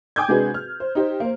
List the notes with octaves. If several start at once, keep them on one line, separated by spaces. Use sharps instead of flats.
G5 G#5 D6 D#6 G6 G#6
C3 G#3 D4 F#4 G#4 B4
F6
C5
D#4 G4 C5
A#3 C5